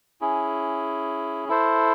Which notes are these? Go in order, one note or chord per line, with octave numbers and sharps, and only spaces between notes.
C#4 E4 G#4
E4 A4 C5